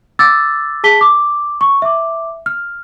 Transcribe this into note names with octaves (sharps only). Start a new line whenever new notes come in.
D6 E6 A6
G#4 A5 B6 G7
D6
C#6
E5 D6
F6